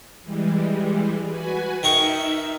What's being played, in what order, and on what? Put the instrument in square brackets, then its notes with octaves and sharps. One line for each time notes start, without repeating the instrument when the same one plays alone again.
[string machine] E3 G3 G#3
F#4 B4 G#5
[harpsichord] D#3 A#4 C#6 [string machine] D#4 E5